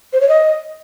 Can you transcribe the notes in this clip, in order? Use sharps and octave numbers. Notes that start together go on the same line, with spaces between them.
C5
C#5
D#5